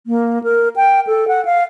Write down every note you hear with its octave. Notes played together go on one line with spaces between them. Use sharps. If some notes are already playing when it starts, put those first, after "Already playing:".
A#3
A#4
G5
A4
F#5
F5